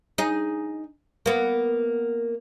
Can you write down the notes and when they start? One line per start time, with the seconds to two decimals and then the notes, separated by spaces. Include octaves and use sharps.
0.18 D#4 G#4
1.26 A#3 B3